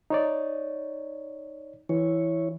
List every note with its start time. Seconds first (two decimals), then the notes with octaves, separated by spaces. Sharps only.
0.10 D#4 C#5 D5
1.89 E3 E4 C#5